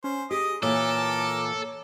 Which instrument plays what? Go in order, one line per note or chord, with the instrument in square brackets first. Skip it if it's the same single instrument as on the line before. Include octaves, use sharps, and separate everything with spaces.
[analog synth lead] C#4 [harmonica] C5
[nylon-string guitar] G4 [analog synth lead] G#4 [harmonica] D#5 D#6
[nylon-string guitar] A#2 E3 [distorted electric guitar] A4 [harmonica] A#4 D6 [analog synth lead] C#5